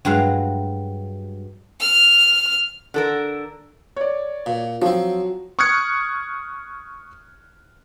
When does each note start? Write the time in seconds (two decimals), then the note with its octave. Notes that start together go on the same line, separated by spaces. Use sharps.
0.05 G2 F#3 G#3 F5
1.80 F6
2.94 D3 A4 A#4
3.96 C#5 D5
4.46 A#2
4.82 F3 F#3 C4
5.59 C#6 D#6 F6 F#6 G#6 C#7